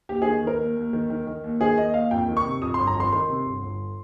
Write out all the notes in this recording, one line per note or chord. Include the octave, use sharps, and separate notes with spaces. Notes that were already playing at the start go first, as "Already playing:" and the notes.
D#2 G4
D#3 G#4
D#3 A#4
D#2
D#2
D#3
D#3
D#3
D#2
D#3 G#4
D#2 D#5
D#2 F5
F2 G5
D#3
C#6
C3
F2 D#6
G1 C6
A#5
F2 C6
D#3 C6
C3
G1
G1